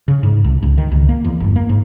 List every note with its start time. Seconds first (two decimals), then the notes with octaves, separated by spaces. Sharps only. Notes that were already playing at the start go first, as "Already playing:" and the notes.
0.08 C#3
0.23 G#2
0.44 C2
0.63 C#2
0.78 D#3
0.92 C#2
1.09 A#3
1.25 E2
1.40 G1
1.56 A#3
1.69 G#2